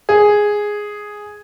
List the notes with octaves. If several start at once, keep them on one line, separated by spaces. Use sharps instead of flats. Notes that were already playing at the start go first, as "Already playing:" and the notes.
G#4